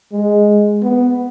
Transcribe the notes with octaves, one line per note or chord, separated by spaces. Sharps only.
G#3
B3